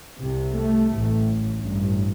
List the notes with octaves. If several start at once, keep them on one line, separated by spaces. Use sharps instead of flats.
C2 C3
A3
A1 A2
A1 G2